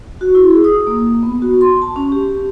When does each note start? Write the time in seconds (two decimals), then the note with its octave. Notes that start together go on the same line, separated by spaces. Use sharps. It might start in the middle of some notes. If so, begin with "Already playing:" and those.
0.21 F#4
0.35 E4
0.51 G#4
0.64 D#6
0.87 A#3
1.23 B3
1.42 F#4
1.61 C6
1.82 A5
1.96 C#4
2.12 G4